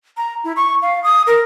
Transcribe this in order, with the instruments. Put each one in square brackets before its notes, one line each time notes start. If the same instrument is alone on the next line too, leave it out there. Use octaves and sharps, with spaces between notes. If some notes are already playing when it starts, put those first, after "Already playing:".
[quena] A#5
E4
C#6
F5
D#6
A#4